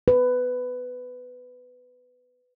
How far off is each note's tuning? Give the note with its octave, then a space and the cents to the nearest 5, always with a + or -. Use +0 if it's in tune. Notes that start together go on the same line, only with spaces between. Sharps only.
B4 +15